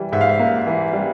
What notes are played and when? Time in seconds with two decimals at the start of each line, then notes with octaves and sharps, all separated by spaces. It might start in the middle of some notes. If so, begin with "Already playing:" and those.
Already playing: E3 G3
0.12 G#2 E5
0.21 F5
0.29 E5
0.40 A#3
0.67 E3
0.93 G3